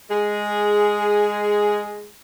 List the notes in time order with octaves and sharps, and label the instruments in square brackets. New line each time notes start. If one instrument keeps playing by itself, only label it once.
[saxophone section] G#3 G#4